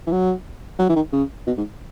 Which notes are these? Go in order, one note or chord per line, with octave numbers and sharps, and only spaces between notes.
E3
F#3
F#3
E3
D#3
C#3
B2
G#2